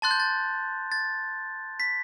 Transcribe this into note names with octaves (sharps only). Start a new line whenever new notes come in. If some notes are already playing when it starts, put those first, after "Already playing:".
A5 C6 F#6 A6
G6
A6
A6
B6